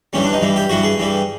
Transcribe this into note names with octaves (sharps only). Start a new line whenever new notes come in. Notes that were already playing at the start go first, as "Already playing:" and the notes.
G2 E3 G3 C#4
D4
D#4
G2 E3 G3
G4
G2 E3 G3 F#4
G#4
G2 E3 G3